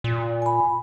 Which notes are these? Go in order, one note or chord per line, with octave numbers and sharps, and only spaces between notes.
A#2
G#5 B5